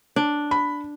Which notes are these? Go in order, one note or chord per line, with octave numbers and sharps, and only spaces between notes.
D4
B5